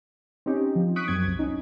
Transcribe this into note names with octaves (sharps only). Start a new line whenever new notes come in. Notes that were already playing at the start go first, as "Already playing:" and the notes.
C4 C#4 D#4 G4
F3
C#6 D#6 F#6 B6 D7
F#2 C4 G#6
C2
C#4 D#4